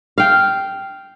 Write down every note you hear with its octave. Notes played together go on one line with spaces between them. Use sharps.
F5 G5